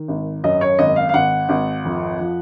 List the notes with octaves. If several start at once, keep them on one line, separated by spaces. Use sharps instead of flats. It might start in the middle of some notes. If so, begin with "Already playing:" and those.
Already playing: D#3
G#1
F#2 D#5
C#5
G#1 D#5
F5
F5
G#1 F#5
G#1
F2
F3